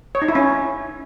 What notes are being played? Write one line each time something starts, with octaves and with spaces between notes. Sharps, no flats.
C#5
D#4
E4
C#4